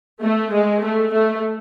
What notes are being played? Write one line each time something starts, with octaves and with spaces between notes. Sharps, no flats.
A3
G#3
A3
A3